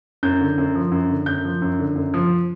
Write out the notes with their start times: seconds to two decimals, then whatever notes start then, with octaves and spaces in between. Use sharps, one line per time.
0.23 F#2 G6
0.41 D3
0.58 F#2
0.75 F3
0.92 F#2
1.09 D3
1.26 F#2 G6
1.45 F3
1.62 F#2
1.79 D3
1.96 F#2
2.14 F3